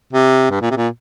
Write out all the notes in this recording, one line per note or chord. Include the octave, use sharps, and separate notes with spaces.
C3
G2
A#2
C3
A#2